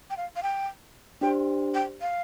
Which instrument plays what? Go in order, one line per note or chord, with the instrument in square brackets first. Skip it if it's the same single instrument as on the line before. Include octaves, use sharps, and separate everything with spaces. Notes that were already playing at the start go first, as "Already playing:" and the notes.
[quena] G5
F5
F5
G5
[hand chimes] D4 G4 C5 [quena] G5
[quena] G5
F5